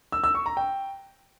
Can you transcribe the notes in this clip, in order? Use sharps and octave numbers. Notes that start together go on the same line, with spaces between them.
E6
E6
C#6
A#5
G5